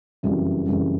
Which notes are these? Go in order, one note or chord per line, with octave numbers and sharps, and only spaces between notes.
F#1 F2 C#3 E3 G3 F#4
F#1 F2 C#3 E3 G3